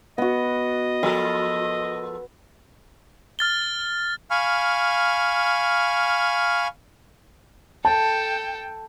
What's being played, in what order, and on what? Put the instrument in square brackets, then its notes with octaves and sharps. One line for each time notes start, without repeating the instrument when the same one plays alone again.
[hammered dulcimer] B3 F#4 [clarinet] D#5
[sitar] F3 A4 A#4 [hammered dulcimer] B5
[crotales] F6 A6 G7
[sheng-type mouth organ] F5 G#5 B5 C#6 F6
[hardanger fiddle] A4 [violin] G5 [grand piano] A5